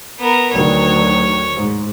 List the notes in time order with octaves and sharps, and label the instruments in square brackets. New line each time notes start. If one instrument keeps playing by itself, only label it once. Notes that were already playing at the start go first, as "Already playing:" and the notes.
[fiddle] B3 A#4
[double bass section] D2 D#3 F#3 [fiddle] C#5
[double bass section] G#2